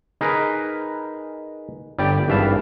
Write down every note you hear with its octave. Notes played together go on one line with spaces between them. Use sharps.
D#4 G#4 A#4 B4
G1 G3 G4 D5 G5
G#1 G2 E3 E5 F5 A5